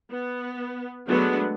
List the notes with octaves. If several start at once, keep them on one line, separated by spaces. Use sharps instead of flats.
B3
D3 F#3 G#3 A3 B3 D4